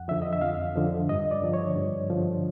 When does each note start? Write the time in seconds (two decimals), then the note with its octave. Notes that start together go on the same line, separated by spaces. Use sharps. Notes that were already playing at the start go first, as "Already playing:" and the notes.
Already playing: F2 F#5
0.08 D3 F3 E5
0.22 D#5
0.33 E5
0.42 F2 F5
0.76 D3 F3
1.09 G2 D#5
1.31 D5
1.42 D3 F3
1.54 C#5
1.76 G2
2.10 D3 F3